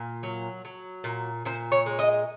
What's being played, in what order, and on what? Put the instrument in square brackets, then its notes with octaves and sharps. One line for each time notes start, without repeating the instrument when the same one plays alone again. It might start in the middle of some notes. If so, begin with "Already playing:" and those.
Already playing: [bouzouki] A#2
F#3
F#3
A#2
A#2 C5
C#5
G#3
D#5